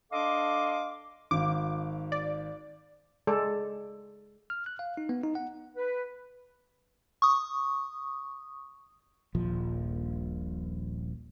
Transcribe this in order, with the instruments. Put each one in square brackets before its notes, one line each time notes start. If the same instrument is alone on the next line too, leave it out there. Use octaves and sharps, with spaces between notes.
[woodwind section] D4 A4 D#5 F5 C6 D6
[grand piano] G#1 F5 [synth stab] D6
[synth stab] D5
[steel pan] G#3 A4 D5
[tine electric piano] F6
F#6
F5
D#4
B3
D#4
F#5
[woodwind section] B4
[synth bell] C#6 D#6
[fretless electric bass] D#1 A#1 F3